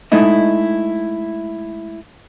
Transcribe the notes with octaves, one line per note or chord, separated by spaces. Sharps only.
G#3 A3 D#4 E4 D#5